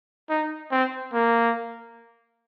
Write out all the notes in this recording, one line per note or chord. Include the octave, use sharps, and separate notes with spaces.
D#4
C4
A#3